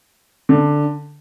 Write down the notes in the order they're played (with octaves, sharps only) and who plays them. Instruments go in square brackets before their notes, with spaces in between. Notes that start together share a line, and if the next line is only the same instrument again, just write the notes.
[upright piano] D3